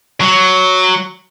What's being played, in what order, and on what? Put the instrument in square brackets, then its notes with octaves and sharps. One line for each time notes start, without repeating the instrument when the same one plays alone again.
[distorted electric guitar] F#3